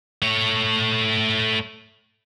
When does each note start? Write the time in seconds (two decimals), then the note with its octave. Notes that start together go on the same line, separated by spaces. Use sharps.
0.22 A3 C#5